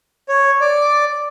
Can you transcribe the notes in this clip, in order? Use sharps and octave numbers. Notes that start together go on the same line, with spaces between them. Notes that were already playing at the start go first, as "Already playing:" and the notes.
C#5
D5